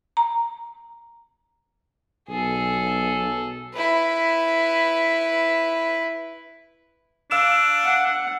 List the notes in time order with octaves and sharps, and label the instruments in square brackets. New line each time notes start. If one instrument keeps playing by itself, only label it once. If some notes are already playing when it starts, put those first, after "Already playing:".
[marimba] A#5
[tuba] B1 [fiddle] G#4 A4
[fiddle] E4 B4
[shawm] D4 [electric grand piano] F5 E6 E7
[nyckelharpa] F#5